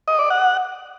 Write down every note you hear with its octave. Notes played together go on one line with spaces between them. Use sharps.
D#5
D5
F#5